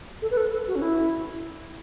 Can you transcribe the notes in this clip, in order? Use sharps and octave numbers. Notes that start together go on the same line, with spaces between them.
A4
B4
A4
A4
F#4
C#4
E4